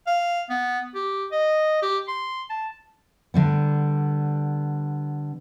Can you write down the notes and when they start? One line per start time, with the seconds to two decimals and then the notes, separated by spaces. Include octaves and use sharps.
0.07 F5
0.50 B3
0.95 G4
1.32 D#5
1.82 G4
2.08 C6
2.50 A5
3.34 D3 G3 B3